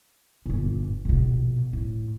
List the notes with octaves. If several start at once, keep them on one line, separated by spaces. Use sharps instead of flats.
G1 A#2
A#1 B2
A2